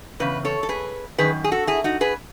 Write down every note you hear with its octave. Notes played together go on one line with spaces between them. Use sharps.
E2 C#3 B4
A4 C#5
A4
G#4 B4
F#2 D#3 G#4 B4
G#4
F#4 A4
E4 G#4
D#4 F#4
G#4 B4